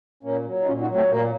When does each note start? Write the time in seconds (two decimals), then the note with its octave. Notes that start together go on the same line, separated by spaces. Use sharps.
0.23 A#2 A#3 C#4
0.45 F#3
0.61 D#4
0.67 A#2 C#4 F4
0.81 D#4 F#4
0.89 F#3
0.95 A3 C4
1.09 A#2 A#3